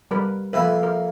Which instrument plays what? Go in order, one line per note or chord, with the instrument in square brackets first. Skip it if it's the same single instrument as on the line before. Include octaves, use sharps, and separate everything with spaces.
[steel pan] G3 A#4 B4
[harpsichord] F2 C3 A#3 [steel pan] B4 E5
[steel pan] A#4